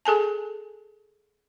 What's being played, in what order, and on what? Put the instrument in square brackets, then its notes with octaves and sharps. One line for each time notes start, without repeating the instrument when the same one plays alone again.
[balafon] G#4 A4 G#5 A5